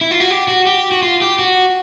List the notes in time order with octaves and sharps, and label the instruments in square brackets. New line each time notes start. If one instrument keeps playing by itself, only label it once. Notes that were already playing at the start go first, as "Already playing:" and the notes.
[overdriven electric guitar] E4
F4
F#4
G4
F#4
G4
F#4
F4
G4
F#4